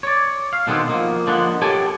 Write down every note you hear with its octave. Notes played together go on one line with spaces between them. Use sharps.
C#5 D5
F5
B2 D3 D#3 G#3 B3 C4
F3 A#3
D3 F3 G#3 A#3 B3
G4 A4 C#5 G5 G#5